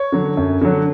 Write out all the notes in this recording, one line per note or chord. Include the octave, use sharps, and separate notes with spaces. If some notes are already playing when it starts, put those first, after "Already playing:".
Already playing: C#5
D3 F#3
F#2
D3 F#3